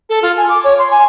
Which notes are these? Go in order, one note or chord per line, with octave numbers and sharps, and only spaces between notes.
A4
F4
G#5
D6
C#5
C6
G#5